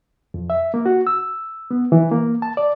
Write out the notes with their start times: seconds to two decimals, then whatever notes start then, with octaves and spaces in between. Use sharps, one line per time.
0.34 F2
0.50 E5
0.74 A#3
0.86 F#4
1.07 E6
1.71 B3
1.92 E3
2.12 A#3
2.42 A5
2.57 D5